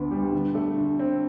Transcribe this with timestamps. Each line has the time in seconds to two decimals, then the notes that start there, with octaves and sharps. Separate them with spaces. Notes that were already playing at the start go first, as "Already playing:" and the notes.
Already playing: D2 D3 B3
0.11 G3
0.32 D3
0.55 A3
0.78 D3
0.99 C4